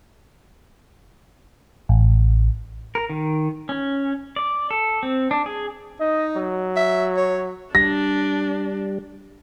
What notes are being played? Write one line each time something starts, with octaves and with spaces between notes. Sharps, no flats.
A1
A#4
D#3
C#4
D5
A4
C4
D4
G#4
D#4 D#5
F#3
E5
C#5
G3 D4 A#6